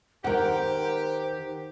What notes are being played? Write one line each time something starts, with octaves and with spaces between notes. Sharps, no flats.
D#3 G4 A#4 C5 F#5